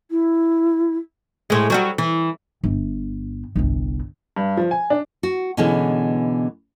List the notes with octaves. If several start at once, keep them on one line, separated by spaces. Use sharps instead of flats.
E4
A2 G#3
F#3 G3 F#4
E3
G1
G1 C2
G2
F3
G#5
D4
F#4
B2 D3 E3 G#3 B3 C#4